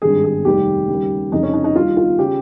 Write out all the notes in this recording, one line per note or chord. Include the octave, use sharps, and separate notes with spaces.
G#1 G2 G3 G#4
G#4
F1 D#2 D#3 G3 G4
D#2 C#3 G3
F1 F2 C#3 D#4
C#4
D#4
D#4
D#2 D#3 G3 F4
F4
C#3 G4